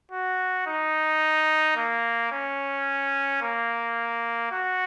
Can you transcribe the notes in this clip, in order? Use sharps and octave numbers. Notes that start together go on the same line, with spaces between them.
F#4
D#4
A#3
C#4
A#3
F#4